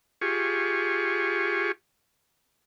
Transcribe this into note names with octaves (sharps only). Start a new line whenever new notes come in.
F4 G4 G#4 C#6